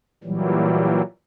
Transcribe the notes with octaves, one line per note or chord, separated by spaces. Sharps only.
A#2 E3 F#3 G3